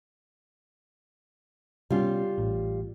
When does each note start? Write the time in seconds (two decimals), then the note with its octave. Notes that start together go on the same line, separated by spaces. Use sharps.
1.90 C3 G3 B3 C#4 F4
2.38 A1